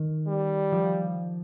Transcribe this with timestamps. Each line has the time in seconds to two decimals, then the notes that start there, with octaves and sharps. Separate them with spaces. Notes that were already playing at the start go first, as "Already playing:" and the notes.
Already playing: D#3
0.27 G3
0.72 F3